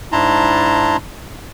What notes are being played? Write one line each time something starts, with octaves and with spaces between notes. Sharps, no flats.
G#2 D4 E4 A5 A#5 C6